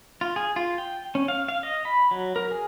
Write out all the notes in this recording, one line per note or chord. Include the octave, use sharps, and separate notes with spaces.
F4
G#4
F4
G5
C#4
F5
F5
D#5
B5
F#3
A#4
G#4